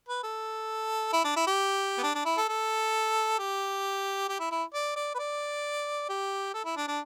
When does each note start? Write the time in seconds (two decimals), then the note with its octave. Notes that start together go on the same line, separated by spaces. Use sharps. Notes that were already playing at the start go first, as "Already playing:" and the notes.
0.09 B4
0.23 A4
1.13 E4
1.24 D4
1.36 E4
1.47 G4
1.98 B3
2.03 D4
2.15 D4
2.25 E4
2.37 A4
2.48 A4
3.39 G4
4.29 G4
4.39 E4
4.52 E4
4.74 D5
4.96 D5
5.15 B4
5.19 D5
6.09 G4
6.54 A4
6.65 E4
6.77 D4
6.88 D4